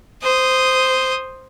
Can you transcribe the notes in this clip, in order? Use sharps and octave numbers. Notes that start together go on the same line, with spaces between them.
C5 D#6